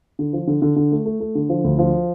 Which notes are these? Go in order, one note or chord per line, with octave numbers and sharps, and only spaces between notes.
D3
F3
D3
D3
D3
A3
A3
A3
D3
F3
D2
F3